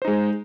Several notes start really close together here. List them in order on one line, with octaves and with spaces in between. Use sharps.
C5 D#4 G#3